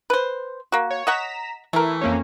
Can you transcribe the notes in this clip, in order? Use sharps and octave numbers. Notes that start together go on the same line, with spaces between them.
B4 C5
A#3 F#4
C#5
D#5 F#5 A#5 C#6 B6 E7
E3 A3 A#4
F2 A#3 C#4